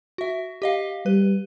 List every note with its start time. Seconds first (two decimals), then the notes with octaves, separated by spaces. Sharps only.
0.18 F#4 E5
0.62 G4 D#5 F5
1.06 G3 B4